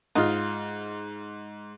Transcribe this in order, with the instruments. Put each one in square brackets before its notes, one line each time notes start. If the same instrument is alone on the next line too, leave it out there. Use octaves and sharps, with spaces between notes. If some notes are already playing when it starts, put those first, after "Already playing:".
[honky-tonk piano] G#2 [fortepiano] F4 D#5